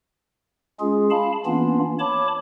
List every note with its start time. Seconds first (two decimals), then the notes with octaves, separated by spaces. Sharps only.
0.80 G#3 C#4 F4 G#4
1.11 F5 A5 B5
1.46 E3 A#3 B3 C#4 D4 F4
1.99 C#5 A5 B5 D6